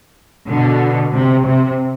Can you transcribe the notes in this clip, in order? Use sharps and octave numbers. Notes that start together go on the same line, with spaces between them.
B2 D3
C3
C3